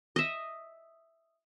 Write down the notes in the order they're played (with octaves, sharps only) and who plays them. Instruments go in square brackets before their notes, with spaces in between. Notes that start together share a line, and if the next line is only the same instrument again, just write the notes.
[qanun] D#5 E5